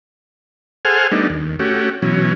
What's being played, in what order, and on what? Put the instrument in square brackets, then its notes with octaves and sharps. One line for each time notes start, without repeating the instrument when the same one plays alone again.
[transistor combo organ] G#4 A4 C5 F#5 G#5 F6
G3 A3 B3 D4 D#4
D#2
A3 C#4 F#4 G4
B2 E3 F#3 C#4